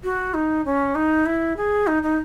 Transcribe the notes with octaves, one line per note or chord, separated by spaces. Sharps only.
F#4
D#4
C#4
D#4
E4
G#4
D#4
D#4